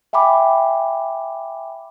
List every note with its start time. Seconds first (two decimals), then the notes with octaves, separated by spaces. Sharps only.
0.13 E5 G5 G#5 B5 D6